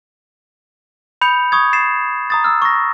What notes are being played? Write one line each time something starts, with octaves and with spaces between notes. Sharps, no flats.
B5 D#6 G6 C#7 F7
C#6 D#6 G#6
A6 C7 E7
A#5 D#6 A6
A#5 E6 F6
C#6 A#6